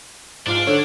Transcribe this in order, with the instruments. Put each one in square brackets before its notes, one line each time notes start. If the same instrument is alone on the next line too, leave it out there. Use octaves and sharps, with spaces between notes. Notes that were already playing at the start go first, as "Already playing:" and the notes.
[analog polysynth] G#2 F3 F5 [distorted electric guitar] D4
[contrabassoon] D3 [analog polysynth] C#5 F#5